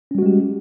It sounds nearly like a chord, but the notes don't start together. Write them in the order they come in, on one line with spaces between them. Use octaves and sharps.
C#4 G3 F#4 G#3 G4